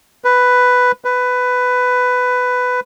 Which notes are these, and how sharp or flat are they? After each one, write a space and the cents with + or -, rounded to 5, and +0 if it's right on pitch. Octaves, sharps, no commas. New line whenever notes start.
B4 +5
B4 +10